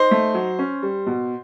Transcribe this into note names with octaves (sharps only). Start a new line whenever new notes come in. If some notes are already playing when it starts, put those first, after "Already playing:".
Already playing: D#4 C5
A3
F#3
C#4
G3
B2